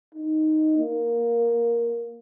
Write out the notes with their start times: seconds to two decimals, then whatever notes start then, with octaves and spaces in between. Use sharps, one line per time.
0.15 D#4
0.78 A#3